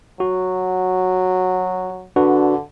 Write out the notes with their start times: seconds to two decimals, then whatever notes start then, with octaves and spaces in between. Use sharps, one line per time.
0.20 F#3 F#4
2.16 D3 D4 F#4 B4